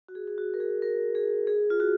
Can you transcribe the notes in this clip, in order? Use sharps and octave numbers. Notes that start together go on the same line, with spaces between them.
F#4
G#4
G#4
F#4
A#4
G#4
A#4
G#4
G#4
F4
F#4